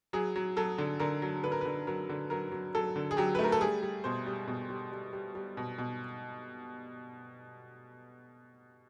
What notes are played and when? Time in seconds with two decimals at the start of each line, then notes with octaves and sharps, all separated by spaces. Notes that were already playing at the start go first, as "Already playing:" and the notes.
0.13 F#3 G#4
0.36 F#3
0.57 F#3 A4
0.78 D3
1.00 D3 A#4
1.22 F#3
1.44 D3 B4
1.52 A#4
1.61 D3 B4
1.87 F#3 A#4
2.09 D3
2.30 F#3 A#4
2.52 F#3
2.75 F#3 A4
2.96 D3
3.11 G#4
3.17 F#3 G4
3.35 A3 B4
3.44 A#4
3.52 A4
3.60 G3 G#4
3.82 G3
4.04 B2 C5
4.26 G3
4.48 B2
4.70 G3
4.92 G3
5.13 G3
5.35 G3
5.57 B2
5.78 B2